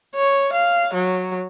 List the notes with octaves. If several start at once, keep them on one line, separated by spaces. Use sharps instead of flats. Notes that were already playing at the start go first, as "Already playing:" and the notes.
C#5
F5
F#3